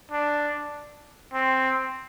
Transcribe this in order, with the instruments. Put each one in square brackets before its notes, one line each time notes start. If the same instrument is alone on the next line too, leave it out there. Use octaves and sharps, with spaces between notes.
[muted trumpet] D4
C4